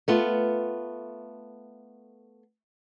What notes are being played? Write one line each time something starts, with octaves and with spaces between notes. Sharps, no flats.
A3 B3 F4